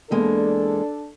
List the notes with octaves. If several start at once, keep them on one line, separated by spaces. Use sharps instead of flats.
E2 G#3 A#3 D4 A4